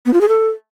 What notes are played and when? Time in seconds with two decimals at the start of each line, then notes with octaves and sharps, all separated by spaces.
0.06 B3
0.13 F4
0.21 G#4
0.29 A4